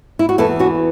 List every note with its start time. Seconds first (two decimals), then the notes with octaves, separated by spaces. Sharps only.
0.19 E4
0.29 F#4
0.38 E2 E3 E4 A4
0.59 C#4 F#4